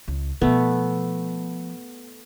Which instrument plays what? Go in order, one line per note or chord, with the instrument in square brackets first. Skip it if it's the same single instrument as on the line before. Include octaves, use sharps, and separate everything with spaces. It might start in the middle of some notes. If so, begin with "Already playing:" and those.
[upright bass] C#2
[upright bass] B2 F3 [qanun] A3 B3